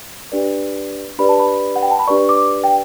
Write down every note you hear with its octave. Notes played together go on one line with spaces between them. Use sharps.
D4 G4 B4 D5
D4 G4 B4 D5 B5
A5
B5
F#5
G5
A5
B5
D4 G4 B4 D5 C#6
D6
G5